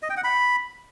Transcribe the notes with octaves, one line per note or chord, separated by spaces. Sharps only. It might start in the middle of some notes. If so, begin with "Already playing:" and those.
D#5
G5
F#5
B5